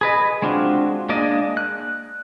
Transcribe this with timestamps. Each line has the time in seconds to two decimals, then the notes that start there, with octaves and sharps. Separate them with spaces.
0.01 G#4 B4 D#5
0.42 G#3 C4 D4 F4 F#4
1.09 G#3 A#3 D4 D5 D#5
1.57 F#6